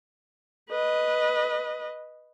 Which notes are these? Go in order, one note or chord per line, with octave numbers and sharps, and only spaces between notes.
B4 D#5